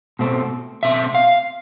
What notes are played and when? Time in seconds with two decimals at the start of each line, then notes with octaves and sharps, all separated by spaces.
0.19 B2 A3 C4
0.83 B2 A3 C4 E5
1.15 F5